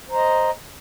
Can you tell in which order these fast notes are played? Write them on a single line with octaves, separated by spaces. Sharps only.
C5 A#5 D#5